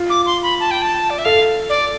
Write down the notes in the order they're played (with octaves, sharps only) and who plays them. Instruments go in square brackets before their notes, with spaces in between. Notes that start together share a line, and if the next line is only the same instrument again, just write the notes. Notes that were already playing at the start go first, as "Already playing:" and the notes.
Already playing: [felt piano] F4
[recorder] D6
C6
B5
A5
G5
A5
D5
E5
[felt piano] A4 [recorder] F5
[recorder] D5